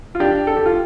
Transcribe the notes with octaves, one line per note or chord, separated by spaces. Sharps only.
F4
D4 G4
A4
G4
F4